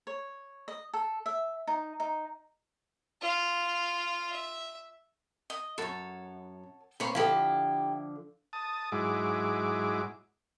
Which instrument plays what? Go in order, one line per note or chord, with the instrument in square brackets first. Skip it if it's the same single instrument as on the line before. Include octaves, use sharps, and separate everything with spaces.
[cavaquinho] C#5
D#5
A4
E5
D#4
D#4
[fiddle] F4 F5
E5
[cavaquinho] D#5
[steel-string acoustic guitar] F#2 [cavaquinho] A4 C#5
[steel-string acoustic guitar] A#3 C4 [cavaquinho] C#5 B5
[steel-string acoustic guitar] D3 F3 [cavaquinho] E4 G4 [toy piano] A4 F5
[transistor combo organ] A5 D#6
G#2 F#3 G#3 E4 D6